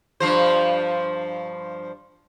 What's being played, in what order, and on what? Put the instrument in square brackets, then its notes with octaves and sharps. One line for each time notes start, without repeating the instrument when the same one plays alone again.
[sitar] G2 F3 C5